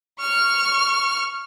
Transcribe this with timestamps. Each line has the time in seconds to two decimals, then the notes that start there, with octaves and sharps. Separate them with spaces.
0.20 C#6 F6